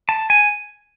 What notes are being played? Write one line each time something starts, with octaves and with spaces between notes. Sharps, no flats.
A5
G#5